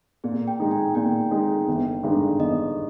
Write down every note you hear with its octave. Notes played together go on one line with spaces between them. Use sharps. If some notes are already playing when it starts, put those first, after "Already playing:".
A#2 G#4
G5
G#3 D#4
G#5
A#2 G5
G#3 D#4
G1
G2 D3 G#3 D#4
G1 D#5